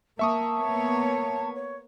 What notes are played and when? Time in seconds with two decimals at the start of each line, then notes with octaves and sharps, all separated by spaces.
0.19 A#3 E5 A5 C#6 D#6
0.58 A#3 B3 C#5
1.54 C#5